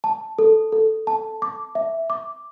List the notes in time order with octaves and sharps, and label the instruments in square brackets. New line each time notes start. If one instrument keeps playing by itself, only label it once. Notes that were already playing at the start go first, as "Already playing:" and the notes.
[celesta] A5
A4
A4
A5
D6
E5
D6